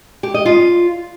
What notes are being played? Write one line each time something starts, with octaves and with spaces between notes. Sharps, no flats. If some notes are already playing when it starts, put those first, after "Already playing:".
G4
D#5
F4